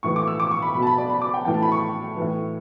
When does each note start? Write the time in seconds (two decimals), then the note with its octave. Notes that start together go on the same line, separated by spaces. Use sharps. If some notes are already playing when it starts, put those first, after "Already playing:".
0.03 A2 E3 C#6
0.16 D6
0.27 E6
0.40 D6
0.51 C#6
0.62 B5
0.74 B2 B5
0.82 A5
0.87 B5
0.98 D5
1.10 B5
1.22 D6
1.34 G5
1.45 A2 E3 G5
1.54 A5
1.63 B5
1.72 C#6
2.17 A2 E3